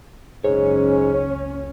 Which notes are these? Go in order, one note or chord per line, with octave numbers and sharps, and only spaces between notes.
F#1 C#2 G#2 C#4 C#5